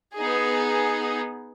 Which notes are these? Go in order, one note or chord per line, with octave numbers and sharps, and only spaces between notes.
B3 D#4 G#4